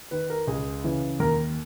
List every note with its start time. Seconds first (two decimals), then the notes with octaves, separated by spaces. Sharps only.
0.11 D#3 B4
0.30 A#4
0.47 C#2 G#4
0.84 C#3 E3
1.20 D#2 A#4